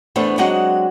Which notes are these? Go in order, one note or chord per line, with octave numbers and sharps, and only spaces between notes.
E2 A3 B3 D4 C5
F#3 G#3 C4 D4 D#5 F#5